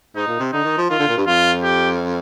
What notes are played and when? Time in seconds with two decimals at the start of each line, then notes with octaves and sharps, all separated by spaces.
0.15 G#2 D#4
0.27 A#2
0.40 C3
0.52 D3 D#4
0.64 D#3
0.78 F3
0.89 D#3 F4
0.99 D3
1.08 A#2
1.17 G2
1.26 F2 F4
1.63 G4